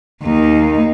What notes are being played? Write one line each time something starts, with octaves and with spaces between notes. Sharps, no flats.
D#2 D#4